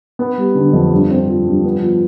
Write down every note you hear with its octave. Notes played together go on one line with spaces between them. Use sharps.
B3
G3
D3
F2
G2
C4
F3
G2
B3
F3